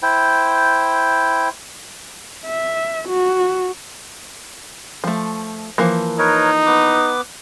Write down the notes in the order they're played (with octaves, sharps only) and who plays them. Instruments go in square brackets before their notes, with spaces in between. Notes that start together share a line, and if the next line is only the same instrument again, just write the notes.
[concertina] E4 C5 G5
[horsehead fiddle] E5
F#4
[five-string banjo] F3 A3
E3 F3 A#3
[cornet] D#4 [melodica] A#4 B4 C#5
[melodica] B3 B4 D6